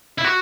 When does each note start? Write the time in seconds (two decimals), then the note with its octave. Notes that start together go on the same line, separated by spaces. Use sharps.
0.18 E4
0.24 F#4